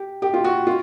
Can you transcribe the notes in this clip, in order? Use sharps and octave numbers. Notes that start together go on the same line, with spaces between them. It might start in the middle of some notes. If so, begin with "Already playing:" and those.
Already playing: G4
G4
F4
F#4
F4